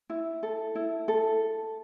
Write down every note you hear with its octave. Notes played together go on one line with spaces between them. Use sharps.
E4
A4
E4
A4